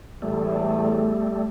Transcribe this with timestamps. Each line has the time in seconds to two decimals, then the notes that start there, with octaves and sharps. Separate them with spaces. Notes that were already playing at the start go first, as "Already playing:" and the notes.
0.22 E2 A2 G3 A3